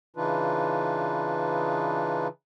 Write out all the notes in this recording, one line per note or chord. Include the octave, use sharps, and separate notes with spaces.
C#3 E3 D4 D#4 F4 B4